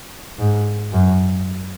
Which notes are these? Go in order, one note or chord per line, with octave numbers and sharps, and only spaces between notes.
G#2
F#2